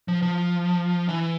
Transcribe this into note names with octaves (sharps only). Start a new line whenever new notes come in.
F3
F3
E3